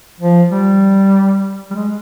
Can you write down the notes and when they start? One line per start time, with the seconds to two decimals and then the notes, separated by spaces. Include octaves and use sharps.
0.20 F3
0.51 G3
1.70 G3
1.75 G#3